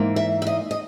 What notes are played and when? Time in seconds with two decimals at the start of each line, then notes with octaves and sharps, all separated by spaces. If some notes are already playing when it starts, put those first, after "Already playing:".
Already playing: G#2 E3 A#3
0.16 E5
0.42 E5
0.47 D#5
0.71 D#5